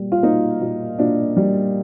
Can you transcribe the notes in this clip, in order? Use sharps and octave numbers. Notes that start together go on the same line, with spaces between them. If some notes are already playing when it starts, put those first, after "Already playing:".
Already playing: A#2 G3
F4
A#3 D#4
A#2
A#2 D4
G3